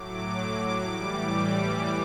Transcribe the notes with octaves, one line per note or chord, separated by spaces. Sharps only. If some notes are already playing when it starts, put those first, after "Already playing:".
Already playing: A2 F#3 D6
A2 E3 G3 D6